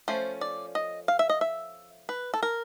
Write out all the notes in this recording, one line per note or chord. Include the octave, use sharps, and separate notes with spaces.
F3 A3 C#4 C5
D5
D#5
F5
E5
D#5
E5
B4
A4
A#4